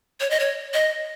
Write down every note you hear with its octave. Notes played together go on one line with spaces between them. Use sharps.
C#5
D#5
C#5
D#5